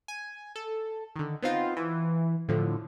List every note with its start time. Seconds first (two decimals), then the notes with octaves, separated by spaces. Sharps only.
0.08 G#5
0.56 A4
1.16 D3 D#3
1.42 B3 C4 D#4 F4 F5
1.77 E3
2.48 A2 D3 F3